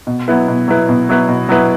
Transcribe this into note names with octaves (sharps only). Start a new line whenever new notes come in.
B2
F#3 B3 E4 B4
B2
F#3 B3 E4 B4
B2
F#3 B3 E4 B4
B2
F#3 B3 E4 B4